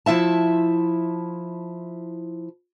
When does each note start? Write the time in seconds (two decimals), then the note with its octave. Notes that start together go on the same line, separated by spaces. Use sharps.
0.06 F3 E4 E5 A5